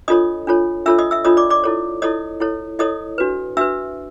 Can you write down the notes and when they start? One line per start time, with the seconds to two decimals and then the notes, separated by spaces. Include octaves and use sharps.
0.08 D4 F4 A4 C#5 D#5 D#6
0.47 D4 F4 A4 C#5
0.86 D4 F4 A4 C#5 E5 E6
0.99 D#5 D#6
1.11 E5 E6
1.25 D4 F4 A4 C#5 D#5 D#6
1.37 D5 D6
1.50 D5 D6
1.64 E4 A4 C#5
2.02 E4 A4 C#5 D#5 D#6
2.40 E4 A4 C#5
2.79 E4 A4 C#5 D#5 D#6
3.18 D4 F#4 B4
3.57 D4 F#4 B4 E5 E6